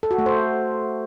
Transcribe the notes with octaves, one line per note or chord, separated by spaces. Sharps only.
A4
F#4
A3
C5